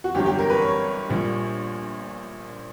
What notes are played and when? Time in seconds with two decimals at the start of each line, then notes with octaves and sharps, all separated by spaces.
0.04 F#4
0.14 G1 G2 F#3 G4
0.26 G4
0.39 A#4
0.50 B4
0.62 C#5
1.09 A#1 A#2 G3